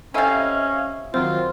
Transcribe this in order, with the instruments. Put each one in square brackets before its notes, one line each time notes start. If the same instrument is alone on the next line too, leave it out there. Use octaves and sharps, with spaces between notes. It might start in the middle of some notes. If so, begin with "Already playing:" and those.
[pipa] C3 E4 [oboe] C#4 [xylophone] A4 G#5 E6 [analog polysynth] D#5 F5
[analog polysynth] D#3 F#3 C4 [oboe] F4 [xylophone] C5